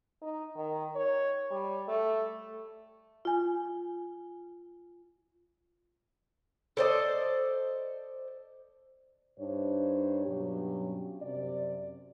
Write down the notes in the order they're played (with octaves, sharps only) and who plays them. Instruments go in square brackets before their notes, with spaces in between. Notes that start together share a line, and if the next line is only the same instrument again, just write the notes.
[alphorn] D#4
D#3
C#5
G3
A3
[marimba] F4 G#5
[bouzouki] A4 C5 D5 D#5
[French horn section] G2 D4 D#4 C5 C#5
G2 B2 F#3 C#4 G4
F#2 C3 D5